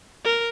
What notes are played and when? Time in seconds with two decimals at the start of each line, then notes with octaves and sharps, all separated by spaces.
0.25 A#4